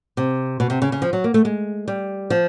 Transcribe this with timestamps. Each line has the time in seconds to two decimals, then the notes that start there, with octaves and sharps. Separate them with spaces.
0.17 C3
0.60 B2
0.70 C3
0.82 C#3
0.92 C#3
1.02 F3
1.13 F#3
1.24 A#3
1.34 A3
1.45 G#3
1.88 G3
2.30 F3